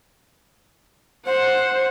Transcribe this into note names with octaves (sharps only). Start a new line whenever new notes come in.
C5 F#5